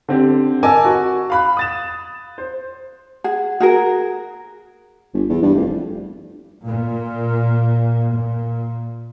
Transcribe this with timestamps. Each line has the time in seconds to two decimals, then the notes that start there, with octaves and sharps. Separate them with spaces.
0.08 D3 C4 G4
0.63 A#4 D#5 G#5 A5 D6 E6
0.84 F#4
1.30 F5 B5 F#6
1.57 D#6 A6 E7
2.38 C5
3.24 G#4 F#5
3.60 F#4 G#4 A#4
5.14 G1
5.29 E2
5.42 G2
5.55 F1
6.64 A#2
8.12 A#2